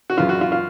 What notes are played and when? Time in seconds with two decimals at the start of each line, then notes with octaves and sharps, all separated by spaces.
0.10 F#4
0.18 F#2 C#3 E3 F4
0.29 F#4
0.41 F4
0.52 F4